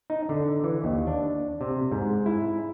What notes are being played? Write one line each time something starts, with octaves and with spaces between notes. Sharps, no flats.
D#4
D3
E3
D#2
D4
C3
G#2
E4